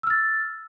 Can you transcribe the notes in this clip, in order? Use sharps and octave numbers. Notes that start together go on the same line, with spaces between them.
E6 F6 A6